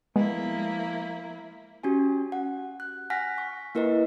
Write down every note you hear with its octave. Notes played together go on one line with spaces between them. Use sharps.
F3 G#3 A#3 B3 E4
C#4 F#4 G4 G#5
F#5
F#6
F#5 G#5 F6 F#6 A#6 B6
C#6
A#3 E4 A#4 B4 D#5